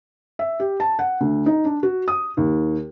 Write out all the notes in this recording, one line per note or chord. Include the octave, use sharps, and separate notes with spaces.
E5
G4
A5
F#5
D2
D#4
D4
F#4
D#6
D#2